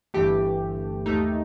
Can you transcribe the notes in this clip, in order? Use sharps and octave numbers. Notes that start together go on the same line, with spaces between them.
G1 G2 E3 A3 G4
D#2 D#3 A3 D#4